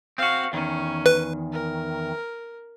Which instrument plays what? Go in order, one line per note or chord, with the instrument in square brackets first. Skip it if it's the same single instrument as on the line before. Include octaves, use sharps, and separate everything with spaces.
[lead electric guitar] C4 F#4 [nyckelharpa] F5
[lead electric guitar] E2 D#3 [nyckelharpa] C#4
[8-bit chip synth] B4
[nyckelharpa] A#4